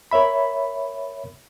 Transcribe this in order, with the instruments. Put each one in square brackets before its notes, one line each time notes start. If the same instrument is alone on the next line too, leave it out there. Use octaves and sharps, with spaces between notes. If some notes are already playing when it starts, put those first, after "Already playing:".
[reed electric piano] A#4 C#5 E5 B5